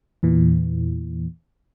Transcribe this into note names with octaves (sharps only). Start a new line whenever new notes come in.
E2 A#2 E3